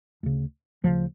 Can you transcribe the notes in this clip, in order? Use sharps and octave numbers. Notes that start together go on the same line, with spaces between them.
D2 C#3
D2 C#3 F3